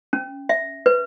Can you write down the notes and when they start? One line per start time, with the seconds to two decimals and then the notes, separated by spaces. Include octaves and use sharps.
0.13 C#4
0.49 E5
0.86 B4